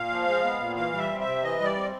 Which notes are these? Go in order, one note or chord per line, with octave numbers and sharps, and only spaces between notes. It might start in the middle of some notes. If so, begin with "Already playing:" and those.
Already playing: A#2 F5
F3
G#3
B3
A#2
E3 F5
G3
E5
C4
E5
C3
E3 D#5
G3 D5
C4